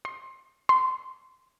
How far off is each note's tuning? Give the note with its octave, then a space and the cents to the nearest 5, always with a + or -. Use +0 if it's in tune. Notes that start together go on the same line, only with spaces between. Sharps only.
C6 +20
C6 -15